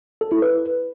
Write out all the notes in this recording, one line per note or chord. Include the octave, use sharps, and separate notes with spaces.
A4
E4
B4